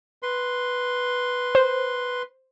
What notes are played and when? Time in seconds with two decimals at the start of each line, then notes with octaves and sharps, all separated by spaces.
0.23 B4 C6
1.55 C5